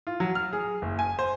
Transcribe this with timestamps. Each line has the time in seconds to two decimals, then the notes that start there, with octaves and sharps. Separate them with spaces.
0.07 F4
0.20 F#3
0.35 F6
0.53 G#4
0.82 F#1
0.99 G#5
1.19 C5